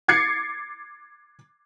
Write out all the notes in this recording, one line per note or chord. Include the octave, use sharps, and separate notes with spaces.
D6 G#6 A6 C7 C#7